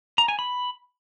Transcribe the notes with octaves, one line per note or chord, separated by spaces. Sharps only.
A#5
G#5
B5